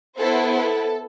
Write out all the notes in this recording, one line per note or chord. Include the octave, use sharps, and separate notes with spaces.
B3 E4 A4 C5
A4